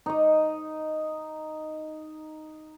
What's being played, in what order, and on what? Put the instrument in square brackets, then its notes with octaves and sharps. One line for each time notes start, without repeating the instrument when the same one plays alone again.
[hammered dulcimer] D#4 D#5